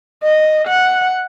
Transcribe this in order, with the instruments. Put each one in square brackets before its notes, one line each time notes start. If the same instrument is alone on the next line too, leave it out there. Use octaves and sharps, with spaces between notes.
[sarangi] D#5
F#5